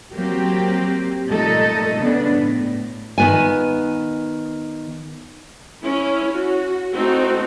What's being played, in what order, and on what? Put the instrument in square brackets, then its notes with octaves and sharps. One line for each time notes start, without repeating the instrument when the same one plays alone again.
[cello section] F#3 A#3 C4 G4
A#2 G3 A3 D#4 A4 D#5
C#3 B3 D4
A2
[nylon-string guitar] D#3 B3 G#5
[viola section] C#4 E4
F#4
A3 C4 D#4 E4 F#4